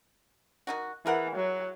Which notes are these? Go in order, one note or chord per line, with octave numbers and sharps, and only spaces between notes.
D#3 D#4 F#4
E3 G#4 A#4 F#5
F#3